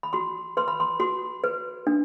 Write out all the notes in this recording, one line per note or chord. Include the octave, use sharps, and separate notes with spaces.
B5
F#4 C6
B4 C6
B5
C6
F#4 C6
B4
D4